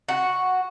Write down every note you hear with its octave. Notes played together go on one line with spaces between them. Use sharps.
F#4